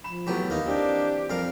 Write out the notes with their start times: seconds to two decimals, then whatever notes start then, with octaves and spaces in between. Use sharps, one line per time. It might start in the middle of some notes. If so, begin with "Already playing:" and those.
0.04 F3 B5 E7
0.27 E3 F#3 A3 B3 G4
0.50 D#2 A#3 D#4
0.66 E3 C4 D4 G4
1.30 F2 G3 A#4 F5